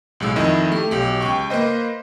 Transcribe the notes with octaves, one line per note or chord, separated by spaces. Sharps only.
B1 A2 G#3 E6
F2 D#3 E4 D#5 E6
A3 G4
B1 G4
C#2 G5 C#6
A#3 B4 C5 D#5